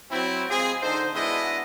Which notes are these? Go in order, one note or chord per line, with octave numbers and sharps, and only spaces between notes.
F#3 C4 E4
G#3 C4 F4 G#4
D3 D#4 A4 C5
G#3 B3 D4 E4 F#4 D#5